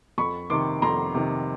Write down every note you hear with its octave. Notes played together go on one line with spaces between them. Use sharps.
F2 B5 C#6
C3 D#3 C6 D6
F2 A#5 C6
C3 D#3